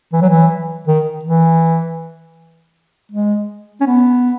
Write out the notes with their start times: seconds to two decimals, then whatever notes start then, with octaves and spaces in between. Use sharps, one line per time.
0.13 E3
0.22 F#3
0.29 E3
0.87 D#3
1.25 E3
3.12 G#3
3.81 C#4
3.86 B3